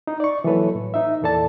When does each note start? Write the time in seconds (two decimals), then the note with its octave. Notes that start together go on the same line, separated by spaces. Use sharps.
0.07 D#4
0.20 D5 C#6
0.44 E3 F#3 A#3 A4 B4 C#5
0.75 A2
0.94 D#4 E5
1.21 E2 A#2 E3 A4 D5 A5